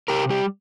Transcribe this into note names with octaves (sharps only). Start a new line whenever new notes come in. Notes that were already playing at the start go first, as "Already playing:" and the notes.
C3 G4 A#4
G3 G4